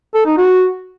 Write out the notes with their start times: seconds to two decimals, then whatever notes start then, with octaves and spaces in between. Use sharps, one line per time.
0.14 A4
0.26 D#4
0.38 F#4